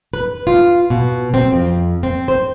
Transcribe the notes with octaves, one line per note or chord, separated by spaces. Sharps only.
B4
F4
B2
C4
F2
C4
C5